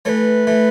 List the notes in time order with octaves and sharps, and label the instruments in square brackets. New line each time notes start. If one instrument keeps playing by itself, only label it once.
[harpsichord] E3 A3 [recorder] B4 C#5
[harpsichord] E3 A3